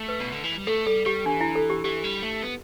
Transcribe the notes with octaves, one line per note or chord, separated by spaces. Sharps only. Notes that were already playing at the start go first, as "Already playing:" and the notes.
Already playing: A3
B4
B2
D3
E3
G3
A3 A4
G3 A4
G3 G4
E3 D4
E4
A4
G4
E3 G4
G3
A3
B3